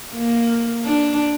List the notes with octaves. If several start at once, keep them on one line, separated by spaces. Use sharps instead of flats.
A#3
D4